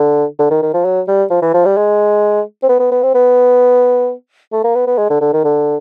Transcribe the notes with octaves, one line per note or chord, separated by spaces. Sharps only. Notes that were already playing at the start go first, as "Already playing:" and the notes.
Already playing: D3
D3
D#3
D#3
F3
F#3
G3
F3
E3
F3
G3
G#3
C4
B3
B3
B3
C4
B3
A3
A#3
B3
B3
G#3
D3
D3
D#3
D3